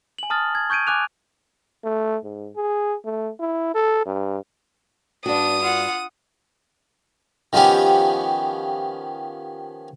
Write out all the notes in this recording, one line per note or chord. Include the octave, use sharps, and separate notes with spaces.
G#5 F#7
A5 D#6 F6 A6
G#6
C#6 G6 G#6 D7 D#7
G#5 D6 F#6 F7
A3
G#2
G#4
A3
E4
A4
G2
G2 D4 F#4 D#6
F4 F#5
D#3 F3 B3 C#4 G4